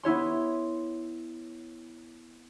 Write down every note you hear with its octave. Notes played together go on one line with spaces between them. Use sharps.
B3 E4 C#5 C6